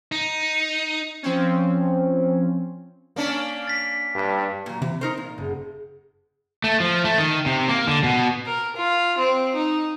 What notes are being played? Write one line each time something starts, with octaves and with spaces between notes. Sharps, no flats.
D#4
F3 C4 C#4
A#3 C#4 D4
A6 B6
G2
A#2 F#3
C3 E3
D#4 A#4 C5
A#2
F#1
A3
F3
A3
D#3
C3
A#3
D3
B2
A#4
F4
C4
D#4